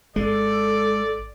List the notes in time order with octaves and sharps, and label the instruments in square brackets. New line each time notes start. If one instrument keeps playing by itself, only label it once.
[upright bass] G#1 [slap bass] G#3 [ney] A4 [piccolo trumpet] D5